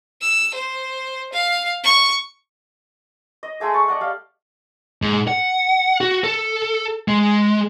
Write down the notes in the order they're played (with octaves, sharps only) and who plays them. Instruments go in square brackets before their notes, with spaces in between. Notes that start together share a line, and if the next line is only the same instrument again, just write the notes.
[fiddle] E6
C5
F5
C#6
[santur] D#5
G#3 A3 G#4 E5
A5 C#6
D5 D#5 F#5
G3 F5
[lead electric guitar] G#2
F#5
F#4
A4
G#3